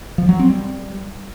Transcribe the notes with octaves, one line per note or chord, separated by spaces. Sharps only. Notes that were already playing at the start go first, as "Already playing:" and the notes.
F3
F#3
C4
G3